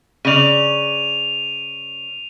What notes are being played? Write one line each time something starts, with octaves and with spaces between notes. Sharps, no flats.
C#3 D5 D#7 F7